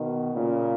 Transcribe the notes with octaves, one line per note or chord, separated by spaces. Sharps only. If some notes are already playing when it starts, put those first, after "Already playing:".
Already playing: B2 D#3
A#2 C#3